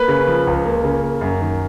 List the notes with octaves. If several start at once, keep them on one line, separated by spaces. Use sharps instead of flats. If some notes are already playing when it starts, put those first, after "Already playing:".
Already playing: A#3 B4
C#3
F3
C#2
A#3
C#3
A#3
F#2
D#3